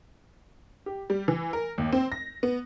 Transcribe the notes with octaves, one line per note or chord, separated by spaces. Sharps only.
G4
G3
E3
A#4
D#2
C4
A#6
B3